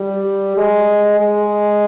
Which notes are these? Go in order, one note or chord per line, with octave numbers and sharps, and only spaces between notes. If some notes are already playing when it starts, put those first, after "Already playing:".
Already playing: G3
G#3
G#3